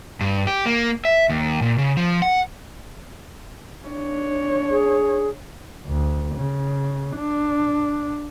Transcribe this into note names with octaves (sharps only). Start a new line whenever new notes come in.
G2
G4
A#3
E5
D#2
A#2
C#3
F3
F#5
D4 C#5
G#4
D2
C#3
D4